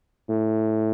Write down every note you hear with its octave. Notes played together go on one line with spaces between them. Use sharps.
A2